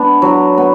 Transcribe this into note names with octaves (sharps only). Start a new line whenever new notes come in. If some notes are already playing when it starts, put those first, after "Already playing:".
Already playing: B3 D4
F#3
B3